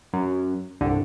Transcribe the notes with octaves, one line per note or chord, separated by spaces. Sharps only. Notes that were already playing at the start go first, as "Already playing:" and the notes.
F#2
C2 G2 D3